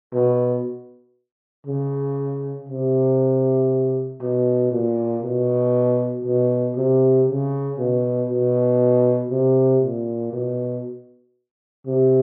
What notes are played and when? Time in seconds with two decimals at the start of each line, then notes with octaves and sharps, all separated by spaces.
0.13 B2
1.67 C#3
2.69 C3
4.22 B2
4.72 A#2
5.23 B2
6.25 B2
6.76 C3
7.27 C#3
7.79 B2
8.30 B2
9.31 C3
9.82 A#2
10.33 B2
11.87 C3